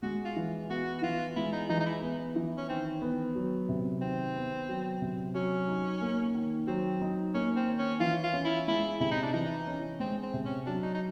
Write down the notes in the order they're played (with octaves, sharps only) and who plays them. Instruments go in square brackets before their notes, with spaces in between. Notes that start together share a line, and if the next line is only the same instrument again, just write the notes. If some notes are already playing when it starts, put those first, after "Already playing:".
[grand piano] G#3 [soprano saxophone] F#4
[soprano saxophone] F4
[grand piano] E3
[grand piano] B3 [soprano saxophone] F#4
[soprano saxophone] F#4
[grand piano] E3 [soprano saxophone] F4
[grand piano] G#3 [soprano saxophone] E4
[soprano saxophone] D#4
[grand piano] E3 [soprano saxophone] D#4
[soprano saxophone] D#4
E4
[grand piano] B3
E3
[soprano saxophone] C#4
[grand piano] D#3 [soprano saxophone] C4
[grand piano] B3
F#3
C3
[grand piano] D#3 [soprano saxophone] C4
[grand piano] B3
F#3
C3
[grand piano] F#3 [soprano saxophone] C#4
[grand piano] D#4
A#3
D#3
[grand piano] F#3 [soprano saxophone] C4
[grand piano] D#4
[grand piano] A#3 [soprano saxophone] C#4
[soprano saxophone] C4
[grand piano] D#3
[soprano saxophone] C#4
[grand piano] E3 [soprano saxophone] F4
[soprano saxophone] F4
[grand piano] C#4
[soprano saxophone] E4
[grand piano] G#3 [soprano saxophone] E4
[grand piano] C3 [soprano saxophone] E4
[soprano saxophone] D#4
D4
[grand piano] E3 [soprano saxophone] D#4
[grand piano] C#4
[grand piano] G#3 [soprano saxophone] C4
[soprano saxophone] C4
[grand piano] C3
[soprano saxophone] C#4
[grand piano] F#3 [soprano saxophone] D4
[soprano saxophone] D#4
D#4